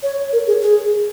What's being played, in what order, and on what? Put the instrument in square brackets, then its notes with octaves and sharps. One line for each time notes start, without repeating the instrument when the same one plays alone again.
[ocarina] C#5
A#4
G#4
G#4